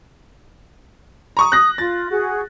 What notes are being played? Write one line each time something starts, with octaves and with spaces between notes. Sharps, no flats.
A#5 C#6 D#6
D#6 F#6 A#6
F4 A6
F#4 G#4